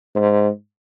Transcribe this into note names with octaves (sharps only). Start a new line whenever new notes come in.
G#2